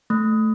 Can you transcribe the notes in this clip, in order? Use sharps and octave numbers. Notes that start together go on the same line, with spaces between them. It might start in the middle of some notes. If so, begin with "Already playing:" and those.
A3